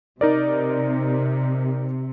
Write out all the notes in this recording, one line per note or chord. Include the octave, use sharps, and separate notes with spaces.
C3 D#4 A#4 D5